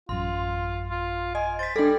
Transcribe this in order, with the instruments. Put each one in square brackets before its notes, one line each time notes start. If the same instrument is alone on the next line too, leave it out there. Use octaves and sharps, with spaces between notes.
[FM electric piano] A1 F#2 [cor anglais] F4 [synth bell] C6
[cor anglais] F4
[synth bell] D#5 [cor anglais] G#5
[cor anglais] C5 [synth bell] A6 B6
[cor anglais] G3 [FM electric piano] D4 A#6 [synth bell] A4 G5